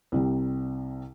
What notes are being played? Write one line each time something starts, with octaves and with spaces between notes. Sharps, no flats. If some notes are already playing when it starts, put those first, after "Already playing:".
C2 C3 G3